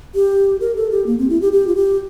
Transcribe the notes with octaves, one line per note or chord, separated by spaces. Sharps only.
G4
A#4
A4
G4
A#3
C4
E4
G4
G4
F4
G4